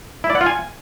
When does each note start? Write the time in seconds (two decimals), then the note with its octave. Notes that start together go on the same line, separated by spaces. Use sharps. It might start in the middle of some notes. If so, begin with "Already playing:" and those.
0.24 E4
0.30 D5
0.35 F#5
0.41 F4
0.46 G#5